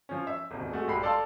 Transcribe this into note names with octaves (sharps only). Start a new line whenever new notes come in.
F3 C#4
E5
D#1 G#1
G#3 A3 F#4
A#1 G2 G3 B5 C7
A4 D5 F5 A5 C6